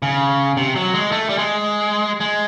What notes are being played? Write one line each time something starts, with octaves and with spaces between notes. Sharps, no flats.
C#3
C3
F#3
G#3
A3
G3
G#3
G#3